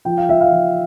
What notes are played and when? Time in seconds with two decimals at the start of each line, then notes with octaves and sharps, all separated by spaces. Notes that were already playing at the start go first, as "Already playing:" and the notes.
0.05 F3 G5
0.17 F5
0.29 F3 E5
0.41 F5
0.52 F3